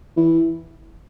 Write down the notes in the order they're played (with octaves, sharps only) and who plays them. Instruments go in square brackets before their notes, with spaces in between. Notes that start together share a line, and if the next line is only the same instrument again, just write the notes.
[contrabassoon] E3